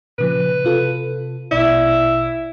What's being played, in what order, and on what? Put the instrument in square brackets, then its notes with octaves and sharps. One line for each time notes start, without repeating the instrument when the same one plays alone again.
[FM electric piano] A#2 C#3 F3 [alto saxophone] B4
[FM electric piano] C3 F4 A4
[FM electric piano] A#1 B2 D5 [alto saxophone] E4